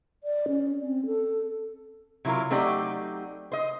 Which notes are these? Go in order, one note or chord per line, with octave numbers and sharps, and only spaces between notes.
D5
C#4
C4
A4
C3 F#3 E4 F4 A#4
F#3 A3 C4 D#4 G4 D5
C5 D#5